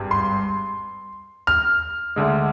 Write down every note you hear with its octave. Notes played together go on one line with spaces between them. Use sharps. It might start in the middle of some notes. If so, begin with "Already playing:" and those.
Already playing: G#1 G2
C6
F6
D2 D3 G#3